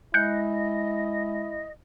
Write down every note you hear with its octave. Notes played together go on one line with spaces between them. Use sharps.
G#3 E4 D#5 F#6 G6 C#7